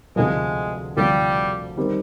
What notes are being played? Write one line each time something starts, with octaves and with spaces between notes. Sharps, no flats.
D2 C3 F3 G#3
D2 C3 F3 G3
D#3 G3 C4